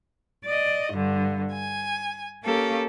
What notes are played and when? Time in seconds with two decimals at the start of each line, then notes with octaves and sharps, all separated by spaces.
0.45 D5 D#5
0.93 G2 D3
1.53 G#5
2.44 A#3 C#4 G4 A4